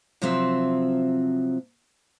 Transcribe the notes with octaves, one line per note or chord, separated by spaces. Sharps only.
C3 F3 F#3 C4 F4 E5